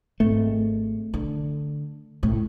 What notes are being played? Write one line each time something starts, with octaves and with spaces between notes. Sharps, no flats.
G#1 A3
D3
C#2 A2